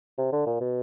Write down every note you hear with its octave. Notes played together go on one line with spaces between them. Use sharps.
C3
D3
A#2
B2